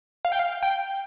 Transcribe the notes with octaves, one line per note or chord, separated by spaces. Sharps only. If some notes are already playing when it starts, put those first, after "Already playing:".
F5
G5
F5
G5